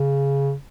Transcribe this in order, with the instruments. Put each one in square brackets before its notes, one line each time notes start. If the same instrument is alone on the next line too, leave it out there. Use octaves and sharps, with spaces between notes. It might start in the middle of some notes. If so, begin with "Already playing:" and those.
Already playing: [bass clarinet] C#3